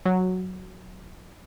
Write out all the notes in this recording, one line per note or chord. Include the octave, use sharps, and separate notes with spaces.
F#3